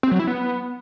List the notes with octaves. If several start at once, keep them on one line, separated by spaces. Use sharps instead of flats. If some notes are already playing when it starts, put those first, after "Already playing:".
C4
F#3
E4
B3